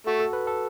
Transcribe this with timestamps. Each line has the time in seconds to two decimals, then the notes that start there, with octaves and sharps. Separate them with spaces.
0.07 A3 F#4
0.20 A4
0.33 B4
0.47 A4